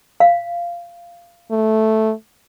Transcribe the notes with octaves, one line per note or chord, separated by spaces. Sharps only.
F5
A3